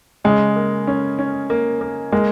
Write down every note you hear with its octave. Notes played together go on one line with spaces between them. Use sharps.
C#3 G#3
A#3
C#4
C#4
A#3
A#3
G#3 A#3